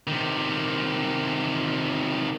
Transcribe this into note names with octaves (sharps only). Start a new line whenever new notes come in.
C3 D#3